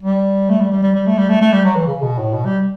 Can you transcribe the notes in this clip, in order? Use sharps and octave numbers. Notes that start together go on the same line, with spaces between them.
G3
A3
G3
G3
G3
G3
A3
G3
A3
A3
G3
F#3
E3
C#3
B2
A2
B2
G3